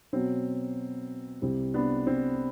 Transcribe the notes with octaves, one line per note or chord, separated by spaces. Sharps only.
B2 F#3 B3 C4
C2 C3 G3 C4
B3 D4
C4